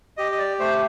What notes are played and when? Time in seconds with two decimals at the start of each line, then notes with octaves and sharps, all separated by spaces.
0.17 G4 D#5
0.32 D#5
0.38 D5
0.60 A3 C5